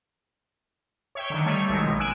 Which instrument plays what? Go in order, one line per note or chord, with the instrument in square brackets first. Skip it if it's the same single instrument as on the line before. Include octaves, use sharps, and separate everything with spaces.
[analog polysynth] C#5 E5 G5
D3 D#3
G3 A3 C#5
B1 D#3 G#3
A#1 B2
G#5 E6 F#6 D7